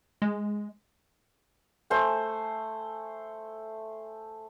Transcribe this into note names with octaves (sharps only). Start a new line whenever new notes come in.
G#3
A3 C5 G#5